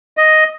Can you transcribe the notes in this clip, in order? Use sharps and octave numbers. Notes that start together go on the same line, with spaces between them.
D#5